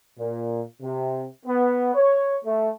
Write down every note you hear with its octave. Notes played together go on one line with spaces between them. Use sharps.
A#2
C3
B3
C#5
A3